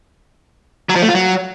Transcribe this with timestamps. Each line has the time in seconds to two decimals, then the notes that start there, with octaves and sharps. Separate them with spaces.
0.89 F#3
0.96 F3
1.02 A3
1.08 F4
1.15 F#3